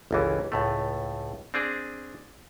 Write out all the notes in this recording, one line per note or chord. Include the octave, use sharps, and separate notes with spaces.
G1 C#2 E3
C#2 A2 A3
C4 D4 G#4